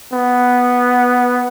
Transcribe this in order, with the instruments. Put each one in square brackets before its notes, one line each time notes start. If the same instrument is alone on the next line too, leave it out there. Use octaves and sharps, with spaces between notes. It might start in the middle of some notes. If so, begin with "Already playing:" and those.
[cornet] B3